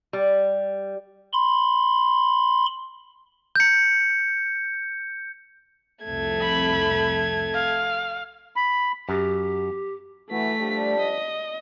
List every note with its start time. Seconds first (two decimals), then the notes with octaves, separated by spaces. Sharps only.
0.13 G3
1.33 B5 C6
3.55 G6 C#7
6.04 C2 F2 A3 G#6
6.41 B5
7.54 F5
8.56 B5
9.09 F#2 G4
10.31 E3 A3 F#4 B6
10.61 F3 G3 D4
11.00 D#5